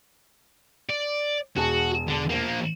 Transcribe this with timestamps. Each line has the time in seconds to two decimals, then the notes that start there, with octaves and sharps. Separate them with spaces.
0.90 D5
1.57 E1 F#4 G#4 A5
2.09 D3 D4
2.30 F3 A#3